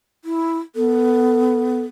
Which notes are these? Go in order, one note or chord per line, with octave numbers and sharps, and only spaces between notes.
E4
B3 A4